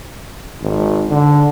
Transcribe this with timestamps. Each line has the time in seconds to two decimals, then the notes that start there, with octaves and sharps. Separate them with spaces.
0.61 G#1
1.09 D3